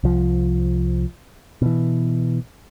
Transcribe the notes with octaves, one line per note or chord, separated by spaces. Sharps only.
C2 F3
B2 E3